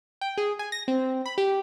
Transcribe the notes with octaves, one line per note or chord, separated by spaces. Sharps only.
G5
G#4
G#5
A#6
C4
B5
G4